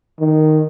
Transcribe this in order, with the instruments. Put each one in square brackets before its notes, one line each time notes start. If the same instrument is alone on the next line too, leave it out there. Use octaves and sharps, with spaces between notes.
[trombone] D#3